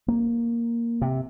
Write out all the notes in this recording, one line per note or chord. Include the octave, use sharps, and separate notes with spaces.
A#3
C3